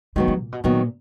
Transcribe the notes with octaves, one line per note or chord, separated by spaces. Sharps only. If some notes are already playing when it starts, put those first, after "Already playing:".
D#3 F#3 G#3 B3
G#3
A#2
B2
A#2 D#3 F#3 B3